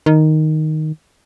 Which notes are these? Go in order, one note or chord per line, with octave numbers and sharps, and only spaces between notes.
D#3